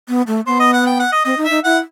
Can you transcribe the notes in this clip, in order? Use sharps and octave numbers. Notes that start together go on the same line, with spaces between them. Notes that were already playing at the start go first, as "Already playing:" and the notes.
B3
A3
B3 C5
D#5
F#5
G5
F#5
D#5
C4 D#5
D#4
E5
D#4
E4 F#5